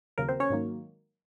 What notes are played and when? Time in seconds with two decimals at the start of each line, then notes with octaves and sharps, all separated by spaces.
0.18 D#2 C#3 F#3 A#3 A#4
0.28 C4 C5
0.40 C#4 C#5
0.50 G#2 D#3 F#3 A#3